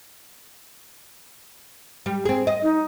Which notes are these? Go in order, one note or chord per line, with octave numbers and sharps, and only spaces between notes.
G3
C4 G#4
D#5
D#4